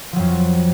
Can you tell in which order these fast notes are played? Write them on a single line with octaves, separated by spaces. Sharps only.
F3 F#3 F2